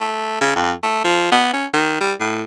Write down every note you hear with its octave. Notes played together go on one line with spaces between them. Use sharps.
A3
C#3
F2
A3
F3
B3
C#4
D#3
G3
A2